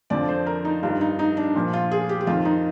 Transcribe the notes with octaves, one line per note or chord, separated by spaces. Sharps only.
F2 D3 F3 D5
C5
A#4
D#4
G2 D#3 F4
D#4
D#4
D4
A#2 F3
F4
G#4
G4
G4
F2 D#3 F4
D#4